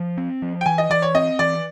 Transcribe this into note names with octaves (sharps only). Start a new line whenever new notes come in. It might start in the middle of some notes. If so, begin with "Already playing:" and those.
Already playing: F3
C4
F3
G5
E3 G#5
D#5
E3 D5
C#5
C4 D#5
E3 D5